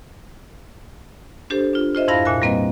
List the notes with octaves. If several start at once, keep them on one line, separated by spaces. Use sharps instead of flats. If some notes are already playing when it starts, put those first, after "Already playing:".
D4 G4 A4 C5
D4 F4
F4 C5 D#5 E5
F2 G#2 E4 F5 B5 A#6
A#2 E5 G#5 F#6
G3 A#3 C4 B4 D#5